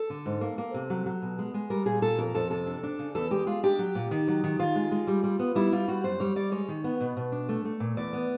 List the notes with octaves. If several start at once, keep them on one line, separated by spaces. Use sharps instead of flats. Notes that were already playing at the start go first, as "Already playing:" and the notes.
Already playing: A4
D3
G#2
A#3
A#3
C3
F#3
F#3
B2
G#3
G#3
G3 A#4
A#2 G#4
A#2 A4
F2 A#4
F2 A4
C3 A4
D4
D4
C#3
E2 A4
G#3 G4
G#3 F4
D4 G4
F#3
A#2
D#3
F#3
D#3
D#3 F4
G#3
G#3
G3
G3
B3
G3 E4
G3 F4
G3 F#4
F#2 C5
G3 C#5
G3 D5
G#3 C#5
D#3
B3
B2
B2
D4
A3
A3
A#2
E2 D5
B3